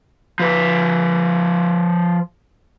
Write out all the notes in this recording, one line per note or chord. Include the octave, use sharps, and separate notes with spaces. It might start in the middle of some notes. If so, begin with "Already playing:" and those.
F3 B4